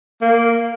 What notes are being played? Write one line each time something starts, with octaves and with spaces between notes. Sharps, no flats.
A#3